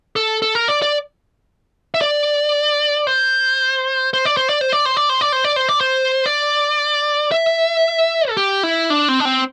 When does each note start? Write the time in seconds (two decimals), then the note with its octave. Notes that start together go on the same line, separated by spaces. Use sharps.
0.16 A4
0.42 A4
0.55 A#4
0.68 D5
0.82 D5
1.94 E5
2.01 D5
3.07 C5
4.13 C5
4.25 D5
4.37 C5
4.49 D5
4.61 C5
4.72 D5
4.85 C5
4.97 D5
5.09 C5
5.21 D5
5.32 C5
5.44 D5
5.56 C5
5.69 D5
5.81 C5
6.26 D5
7.32 E5
8.29 A4
8.37 G4
8.63 E4
8.90 D4
9.08 C4
9.20 D4
9.25 C4